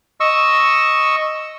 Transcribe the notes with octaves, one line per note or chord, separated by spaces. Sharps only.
D#5 C#6 E6